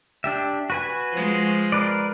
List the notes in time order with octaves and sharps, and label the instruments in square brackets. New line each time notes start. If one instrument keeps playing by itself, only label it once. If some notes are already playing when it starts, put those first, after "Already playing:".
[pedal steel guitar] D4 G4 E5
F#4 B4 G#5
[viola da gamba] F3 G#3
[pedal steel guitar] A#4 B4 D5